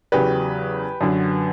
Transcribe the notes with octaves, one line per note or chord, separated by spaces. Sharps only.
E2 C#3 F#3 G4 B4
F#2 D3 F#3